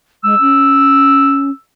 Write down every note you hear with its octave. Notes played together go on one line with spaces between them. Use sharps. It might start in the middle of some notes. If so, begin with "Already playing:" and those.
G#3 E6
C#4